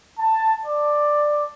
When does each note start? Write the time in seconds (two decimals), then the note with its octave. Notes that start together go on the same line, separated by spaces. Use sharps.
0.19 A5
0.66 D5